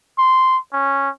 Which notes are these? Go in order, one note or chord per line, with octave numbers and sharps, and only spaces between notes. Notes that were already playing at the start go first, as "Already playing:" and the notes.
C6
C#4